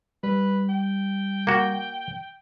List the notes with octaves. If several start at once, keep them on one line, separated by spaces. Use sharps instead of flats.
G3 B4
G5
A#3 F#4